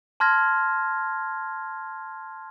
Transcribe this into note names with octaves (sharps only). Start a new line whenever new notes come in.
A5 C6 F6 G#6 A#6